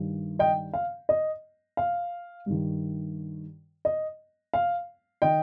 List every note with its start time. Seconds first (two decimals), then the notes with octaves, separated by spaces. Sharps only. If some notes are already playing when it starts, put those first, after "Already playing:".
Already playing: G2 D#3
0.39 D#5 G5
0.74 F5
1.09 D#5
1.77 F5
2.46 G2 D#3
3.85 D#5
4.54 F5
5.22 D#3 D#5 G5